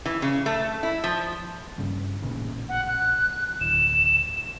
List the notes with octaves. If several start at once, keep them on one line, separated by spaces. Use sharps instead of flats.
E3
C#3
A3
E4
F3
G2 C#3
A1 A#2 C#3
F#5
F#6
D1 E7